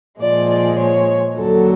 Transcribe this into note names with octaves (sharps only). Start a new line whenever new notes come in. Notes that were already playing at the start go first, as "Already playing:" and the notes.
A#2 F3 G#3 D5
D5
C#5
D#2 D3 F#3 A4